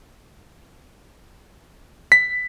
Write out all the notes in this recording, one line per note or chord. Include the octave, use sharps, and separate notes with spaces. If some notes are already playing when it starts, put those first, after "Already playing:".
B6